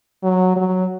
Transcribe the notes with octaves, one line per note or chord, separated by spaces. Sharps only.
F#3
F#3